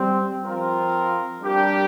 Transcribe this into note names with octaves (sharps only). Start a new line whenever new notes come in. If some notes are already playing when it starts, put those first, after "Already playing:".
Already playing: G3 C4
F3 C4 F4 A#4
G3 D4 G4 A#4